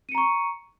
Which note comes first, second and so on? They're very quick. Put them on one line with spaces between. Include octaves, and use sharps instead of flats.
D#7 C#7 A#5 C#6